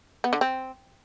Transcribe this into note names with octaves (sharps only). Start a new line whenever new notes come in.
B3
D3
C4